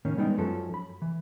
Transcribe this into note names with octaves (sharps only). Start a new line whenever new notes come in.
A2 D#3 A#3 C#4
G3 G#3 B3 D#4 G5
F#2 F3 C#4 A4
B5
E3